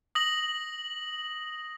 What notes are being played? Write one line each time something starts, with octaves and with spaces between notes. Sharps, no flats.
D#6 A#6 F#7